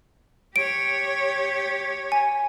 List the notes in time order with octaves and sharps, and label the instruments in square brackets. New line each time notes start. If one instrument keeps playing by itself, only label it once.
[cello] G4 C#5 [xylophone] D7
[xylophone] G#5